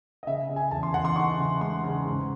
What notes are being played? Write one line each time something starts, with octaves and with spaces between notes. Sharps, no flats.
D#5
C#3 E5
C#3
G#5
E2 A5
C6
E2 F#5
C6
D#4 C#6
C#3
G#3 C6
C#3
G#2